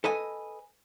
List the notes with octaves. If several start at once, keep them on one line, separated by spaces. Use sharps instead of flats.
A4 B4 D#5 G#5